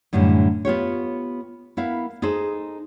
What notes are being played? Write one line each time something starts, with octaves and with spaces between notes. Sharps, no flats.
F#2 A2 D3 E3 G3
B3 F4 G4 C#5
B3 E4 A#4 F5
D#4 G#4 A4 C5